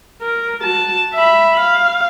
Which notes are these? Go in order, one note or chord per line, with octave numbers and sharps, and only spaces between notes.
A#4
F#4 A5
E5 B5
F5